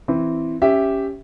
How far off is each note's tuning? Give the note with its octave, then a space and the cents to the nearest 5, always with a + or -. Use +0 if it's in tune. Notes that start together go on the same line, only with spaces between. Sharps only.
E3 +0 C4 +0 E4 +0
C#4 +0 G4 +0 E5 +0